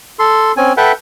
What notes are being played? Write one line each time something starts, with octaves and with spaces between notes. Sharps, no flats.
A4 C6
C4 C#4 G#5
A4 B4 E5 F#5 G5